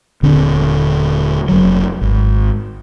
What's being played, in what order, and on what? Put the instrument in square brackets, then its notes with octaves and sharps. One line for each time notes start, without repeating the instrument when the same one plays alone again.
[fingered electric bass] D#1 D3 C4 D4
F1 F#3
G#1